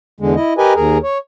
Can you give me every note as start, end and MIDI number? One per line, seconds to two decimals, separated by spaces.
0.20 0.35 40
0.20 0.35 50
0.20 0.35 56
0.36 0.53 64
0.36 0.53 75
0.58 0.73 67
0.58 0.73 70
0.58 0.73 71
0.58 0.73 75
0.58 0.73 80
0.76 0.98 39
0.76 0.98 68
0.76 0.98 70
1.03 1.18 73